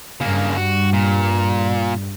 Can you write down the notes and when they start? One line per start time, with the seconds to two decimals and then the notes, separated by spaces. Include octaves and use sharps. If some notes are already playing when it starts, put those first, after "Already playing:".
0.21 G2 C#3 A#3
0.56 F#4
0.93 A#2